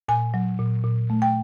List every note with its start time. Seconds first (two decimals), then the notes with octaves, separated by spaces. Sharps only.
0.08 A#2 G#5
0.34 F#3
0.59 A#2
0.84 A#2
1.10 A3
1.22 G5